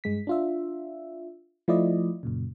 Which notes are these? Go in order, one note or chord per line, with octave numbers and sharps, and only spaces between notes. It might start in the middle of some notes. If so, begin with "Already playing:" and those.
G2 G#3 B6
D4 F4 E5
F3 A3 E4 F4 D5 D#5
F#2 A#2 C#3